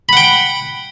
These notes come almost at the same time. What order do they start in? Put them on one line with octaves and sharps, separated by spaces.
B5 F#5 G5